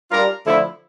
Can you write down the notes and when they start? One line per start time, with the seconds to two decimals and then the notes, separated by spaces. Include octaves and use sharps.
0.11 G3 D4 F4 A#4
0.45 D3 F3 A3 E4